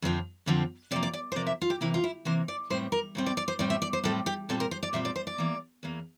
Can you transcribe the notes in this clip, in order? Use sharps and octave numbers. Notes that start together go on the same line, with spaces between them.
F2 D3 F3 C4
F2 D3 F3 C4
C3 F3 A#3 D5
D5
D5
C5
C3 F3 A#3 D5
E5
F4
G4
C3 E3 A#3 E4
F4
E4
C3 E3 A#3 C5
D5
A2 G3 C4 C5
A#4
A2 G3 C4
D5
D5
C5
A2 G3 C4 D5
E5
D5
C5
A2 G3 C4 A4
G4
A#2 G3 C4 A4
A#4
C5
D5
A#2 G3 C4 E5
D5
C5
D5
E2 E3 A#3
E2 E3 A#3